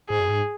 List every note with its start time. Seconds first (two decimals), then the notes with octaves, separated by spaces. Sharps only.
0.09 G#2 G#4
0.20 F#2
0.29 G#2